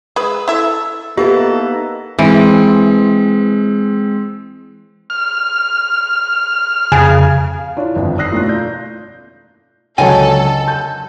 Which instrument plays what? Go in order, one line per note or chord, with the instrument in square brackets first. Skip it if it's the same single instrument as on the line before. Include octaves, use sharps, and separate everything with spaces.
[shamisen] G#3 B4 [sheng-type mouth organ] E6
[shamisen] E4 E5 [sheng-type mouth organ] A4
[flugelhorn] A#3 [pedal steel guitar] B3 D#4 [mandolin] E4 A4 B4 [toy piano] G4
[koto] E3 [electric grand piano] G#3 C4
[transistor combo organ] F6
[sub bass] F2 [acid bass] C#3 [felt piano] G#5
[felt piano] F5
D4 E4 F4 C#5 D5
G1 F2 D#3
D5 D#6 E6 F#6 A#6 C7
B2 A3 A#3 C#4 D#4 F4
F4 D5 G6
[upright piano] C#2 D3 F#3 [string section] A4 [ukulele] C#5 D#5 G#5
[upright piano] G6